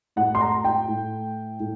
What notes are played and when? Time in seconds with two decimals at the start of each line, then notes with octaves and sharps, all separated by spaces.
0.16 A2 F#5
0.35 C6
0.41 A#5
0.65 G5
0.88 A2
1.60 A2